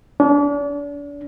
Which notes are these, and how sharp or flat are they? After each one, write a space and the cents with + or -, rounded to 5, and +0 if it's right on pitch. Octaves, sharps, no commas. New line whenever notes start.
D4 -35